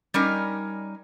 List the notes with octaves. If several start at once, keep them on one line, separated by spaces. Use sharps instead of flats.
G3 C#4 D#4 A#4